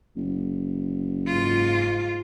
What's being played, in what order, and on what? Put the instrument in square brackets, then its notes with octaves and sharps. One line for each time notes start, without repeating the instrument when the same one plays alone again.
[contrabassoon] F#1
[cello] G#2 F4